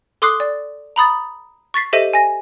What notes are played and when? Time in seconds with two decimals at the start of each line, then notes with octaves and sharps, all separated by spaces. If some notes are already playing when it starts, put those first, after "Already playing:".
0.22 A4 C6 D6 D#6 F#6 C7
0.40 D5
0.96 A#5 B5 D#6 A6
1.74 C#6 A6 B6 C7
1.93 G4 A4 C5 D#5 E5 D#7
2.13 G#5 A#6